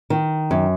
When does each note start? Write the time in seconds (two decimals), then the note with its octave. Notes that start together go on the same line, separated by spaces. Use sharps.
0.10 D#3
0.51 F#2